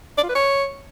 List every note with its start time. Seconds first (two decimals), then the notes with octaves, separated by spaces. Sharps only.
0.18 D5
0.23 F4
0.29 B4
0.35 C#5